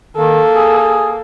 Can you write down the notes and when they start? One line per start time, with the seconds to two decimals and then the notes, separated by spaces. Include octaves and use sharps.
0.16 D#3 A#3 A4
0.54 G#4